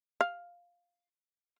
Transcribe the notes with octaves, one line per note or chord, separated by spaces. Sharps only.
F5